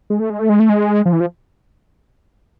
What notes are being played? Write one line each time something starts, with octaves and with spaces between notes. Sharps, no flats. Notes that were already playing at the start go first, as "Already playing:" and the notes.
G#3
A3
G#3
A3
G#3
A3
G#3
F3
E3
F3